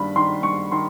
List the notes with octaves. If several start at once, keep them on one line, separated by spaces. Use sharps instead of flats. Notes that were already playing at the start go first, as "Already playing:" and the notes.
Already playing: G2 D#3 B5
D#3 C6
G2 C#6
D#3 C6